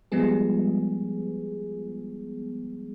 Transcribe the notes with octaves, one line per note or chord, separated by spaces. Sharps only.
F3 G3 G#3 B3 G#4